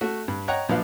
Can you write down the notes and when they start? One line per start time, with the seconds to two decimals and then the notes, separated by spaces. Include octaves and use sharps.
0.01 A3 F#4
0.28 G2
0.48 C#5 D#5 F#5 G5 A#5
0.69 A#1 F3 F#3 D4 B4 F5